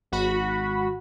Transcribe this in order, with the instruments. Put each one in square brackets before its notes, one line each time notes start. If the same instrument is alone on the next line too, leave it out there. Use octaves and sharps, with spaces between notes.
[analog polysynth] G#1 F#4 B5